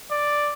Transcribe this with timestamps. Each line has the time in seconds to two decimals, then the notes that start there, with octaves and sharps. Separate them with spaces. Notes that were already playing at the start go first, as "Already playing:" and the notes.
0.11 D5